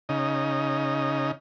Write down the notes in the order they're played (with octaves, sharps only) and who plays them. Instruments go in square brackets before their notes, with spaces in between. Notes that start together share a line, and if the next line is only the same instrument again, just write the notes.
[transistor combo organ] C#3 D#4